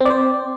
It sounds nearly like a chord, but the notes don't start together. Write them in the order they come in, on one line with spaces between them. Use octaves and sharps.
C4 D5 C5